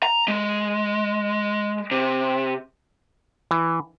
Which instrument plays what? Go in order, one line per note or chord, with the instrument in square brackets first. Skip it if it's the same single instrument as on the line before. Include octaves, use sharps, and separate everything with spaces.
[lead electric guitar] A#5
G#3
C3
[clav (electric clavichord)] E3